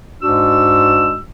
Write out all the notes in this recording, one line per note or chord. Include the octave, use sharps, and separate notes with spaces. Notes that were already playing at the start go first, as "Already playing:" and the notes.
G#2 G#3 D4 F#4 E6